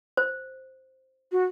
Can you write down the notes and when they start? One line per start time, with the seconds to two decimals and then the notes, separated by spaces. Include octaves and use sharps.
0.17 C5
1.32 F#4